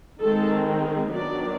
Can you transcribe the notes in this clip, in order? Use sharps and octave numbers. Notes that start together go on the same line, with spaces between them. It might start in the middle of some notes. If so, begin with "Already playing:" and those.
D#3 G#3 C4 A4
D#3 F#3 B3 D4 D5